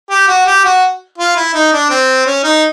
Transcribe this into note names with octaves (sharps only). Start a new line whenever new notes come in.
G4
F#4
G4
F#4
F4
E4
D#4
D4
C4
C#4
D#4